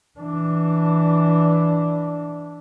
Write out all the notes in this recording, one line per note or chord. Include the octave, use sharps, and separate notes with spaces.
E3 D4